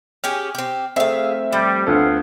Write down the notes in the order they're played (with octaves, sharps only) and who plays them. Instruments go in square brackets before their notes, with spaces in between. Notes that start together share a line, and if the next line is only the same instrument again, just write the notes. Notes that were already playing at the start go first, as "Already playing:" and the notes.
[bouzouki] C#4 G4 G#4 [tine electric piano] F6
[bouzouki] C4 G4
[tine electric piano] A3 C4 [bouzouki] G#4 F5 [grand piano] E5
[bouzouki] F3 [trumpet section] G3
[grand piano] D2 F4 A4 [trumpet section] B3 F5 F#5